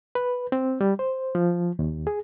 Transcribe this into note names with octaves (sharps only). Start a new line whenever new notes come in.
B4
C4
G3
C5
F3
D#2
G#4